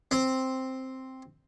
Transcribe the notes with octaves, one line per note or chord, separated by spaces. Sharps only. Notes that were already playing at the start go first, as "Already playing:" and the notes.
C4